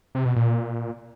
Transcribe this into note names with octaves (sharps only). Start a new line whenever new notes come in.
C3
B2
A#2